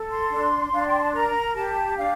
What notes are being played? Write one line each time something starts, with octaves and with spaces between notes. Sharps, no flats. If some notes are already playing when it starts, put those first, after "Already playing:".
Already playing: A4
C6
D4
D4 F5
G5
A5
A#4 A#5
G4 A5
D4 F5